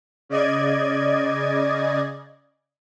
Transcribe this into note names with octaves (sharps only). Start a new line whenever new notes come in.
C#3 D5 D#5 G#6